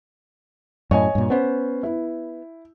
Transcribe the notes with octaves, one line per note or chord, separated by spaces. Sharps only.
F#2 A2 C#5 D#5 G#5
G2 A#2
B3 C#4 C5
E4